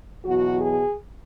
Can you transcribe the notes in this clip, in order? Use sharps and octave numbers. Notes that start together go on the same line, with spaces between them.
E2 B2 F#3 F#4
G#4